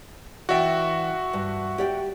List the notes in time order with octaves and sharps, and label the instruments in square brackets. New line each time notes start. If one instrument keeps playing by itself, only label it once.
[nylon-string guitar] E3 D5 G5 [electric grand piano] F#4 E5
[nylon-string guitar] G2
G4 D5 G5